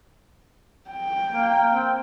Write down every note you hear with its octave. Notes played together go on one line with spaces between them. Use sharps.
G5
A#3
C4